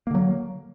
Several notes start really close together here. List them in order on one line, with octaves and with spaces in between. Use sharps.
A#3 D3 F#3